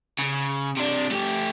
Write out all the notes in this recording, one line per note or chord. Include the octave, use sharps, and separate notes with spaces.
C#3
C3 D4
A3 G4